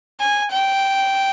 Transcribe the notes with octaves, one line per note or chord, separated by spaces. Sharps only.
G#5
G5